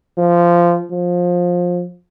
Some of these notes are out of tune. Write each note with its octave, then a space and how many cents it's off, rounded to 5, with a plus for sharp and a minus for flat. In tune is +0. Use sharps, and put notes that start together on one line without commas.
F3 -15
F3 +20